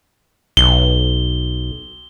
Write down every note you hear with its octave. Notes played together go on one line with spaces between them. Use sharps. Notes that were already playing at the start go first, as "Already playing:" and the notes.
B1 G7